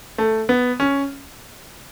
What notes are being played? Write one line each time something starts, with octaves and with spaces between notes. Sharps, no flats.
A3
B3
C#4